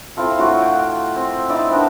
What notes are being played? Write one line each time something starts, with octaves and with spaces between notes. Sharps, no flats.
C4 E4 F4 A4
A2 F4 F#4 C#6
G5
C4
D#4 E4 D5 E5
B3 C4 D4 A#4